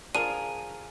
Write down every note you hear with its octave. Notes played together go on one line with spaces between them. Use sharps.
F3 D4 F4 G#4 A#4 D#7